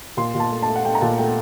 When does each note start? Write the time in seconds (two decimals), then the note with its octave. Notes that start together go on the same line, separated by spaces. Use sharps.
0.17 A#2 C6
0.35 A#2 A5
0.51 A3
0.62 A5
0.68 A3
0.76 F#5
0.85 A3 G5
0.95 A#5
1.01 A#2 A5
1.18 A3 G5